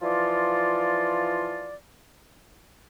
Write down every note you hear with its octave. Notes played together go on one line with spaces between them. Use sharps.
E3 F3 F4 D5